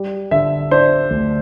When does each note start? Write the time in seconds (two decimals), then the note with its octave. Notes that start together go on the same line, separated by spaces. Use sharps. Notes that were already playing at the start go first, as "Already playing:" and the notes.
Already playing: G3
0.31 D3 E5
0.71 D4 C5
1.11 D2